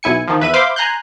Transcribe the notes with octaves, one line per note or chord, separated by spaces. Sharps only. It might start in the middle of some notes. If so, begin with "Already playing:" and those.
B1 E4 G#5 C#7
D#3 F3
E2 B4 E5 D#7
C5 E5 F5 B5 C6 D6
G#5 A#5 C6 F#6 G6